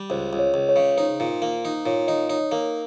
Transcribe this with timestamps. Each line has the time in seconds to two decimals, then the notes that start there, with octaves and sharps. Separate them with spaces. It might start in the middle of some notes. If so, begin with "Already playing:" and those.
Already playing: G3
0.10 C#2 C5
0.33 C#2
0.39 C#5
0.54 C#2
0.69 C#5
0.76 C#3
0.98 D#4 C5
1.20 A#2
1.42 A#3
1.65 D#4
1.86 A#2 C#5
2.08 D#4 D#5
2.30 D#4 C#5
2.52 A#3 A#4